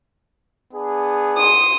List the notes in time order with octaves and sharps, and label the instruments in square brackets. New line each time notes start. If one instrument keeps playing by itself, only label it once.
[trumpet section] B3 D4 G#4
[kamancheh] C6 D#6